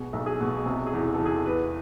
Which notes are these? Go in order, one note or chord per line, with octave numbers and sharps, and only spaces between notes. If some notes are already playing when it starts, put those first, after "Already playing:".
Already playing: B2 G#4
B1
G#4
B2
C3 G#4
G#4
E2
E2 A4
G#4
E2 B4